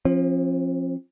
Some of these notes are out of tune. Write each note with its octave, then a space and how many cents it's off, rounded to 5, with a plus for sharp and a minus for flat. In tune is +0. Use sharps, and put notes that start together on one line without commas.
F3 +0 C4 +45